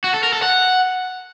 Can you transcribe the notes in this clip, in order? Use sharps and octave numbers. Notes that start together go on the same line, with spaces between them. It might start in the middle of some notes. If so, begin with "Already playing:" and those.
F#4
A4
A#4
A4
F#5